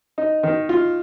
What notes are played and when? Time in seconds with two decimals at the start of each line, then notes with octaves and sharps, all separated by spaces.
0.18 D#4
0.43 D#3
0.69 F4